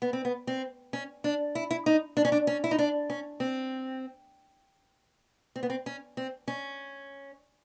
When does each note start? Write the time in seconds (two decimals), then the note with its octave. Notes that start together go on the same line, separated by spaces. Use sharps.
0.02 B3
0.13 C4
0.25 B3
0.47 C4
0.93 C#4
1.24 D4
1.55 E4
1.71 E4
1.86 D#4
2.17 D4
2.25 C#4
2.32 D4
2.47 C#4
2.64 E4
2.71 D#4
2.79 D4
3.10 C#4
3.40 C4
5.56 C4
5.63 B3
5.70 C4
5.86 C#4
6.17 C4
6.48 C#4